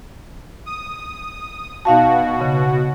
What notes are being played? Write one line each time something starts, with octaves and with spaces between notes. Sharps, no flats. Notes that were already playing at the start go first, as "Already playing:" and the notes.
D#6
B2 D#4 F#4 F5 A5
C#3